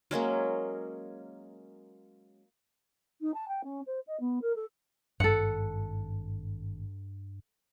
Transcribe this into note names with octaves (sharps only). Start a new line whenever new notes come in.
F#3 G#3 A#3 C#4
D#4
A5
G5
C#4
C5
D#5
B3
A#4
A4
G#1 G2 A4 F#5